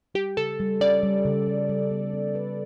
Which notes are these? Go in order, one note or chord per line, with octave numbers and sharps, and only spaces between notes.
G3 G4
C#3 A4
G3
C#4 D5
G3
C#3
G3
G3
B3
B3
B4